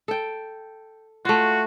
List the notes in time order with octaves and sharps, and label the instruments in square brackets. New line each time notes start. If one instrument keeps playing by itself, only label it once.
[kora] A4 G5
[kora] A3 F4 [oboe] F#4